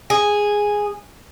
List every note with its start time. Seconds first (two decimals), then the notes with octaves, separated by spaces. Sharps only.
0.10 G#4